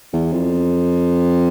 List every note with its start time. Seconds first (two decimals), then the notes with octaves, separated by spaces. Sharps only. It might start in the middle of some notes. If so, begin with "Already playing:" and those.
0.13 E2
0.32 F2